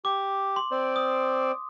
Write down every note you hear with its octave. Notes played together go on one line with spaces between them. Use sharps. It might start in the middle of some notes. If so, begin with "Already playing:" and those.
G4 D6
C6
C4 C5 D5
D#6